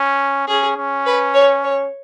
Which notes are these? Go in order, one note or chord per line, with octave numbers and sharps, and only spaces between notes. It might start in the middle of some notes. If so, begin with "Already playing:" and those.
Already playing: C#4
C#4 G#4
C#4
B4
C#5
C#5